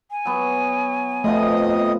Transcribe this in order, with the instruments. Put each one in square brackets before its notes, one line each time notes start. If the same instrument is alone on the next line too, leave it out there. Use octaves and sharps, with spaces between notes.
[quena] G#5
[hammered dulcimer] F#3 B3
[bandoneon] F2 D#5 D#6 [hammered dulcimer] B2 F3 [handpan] A3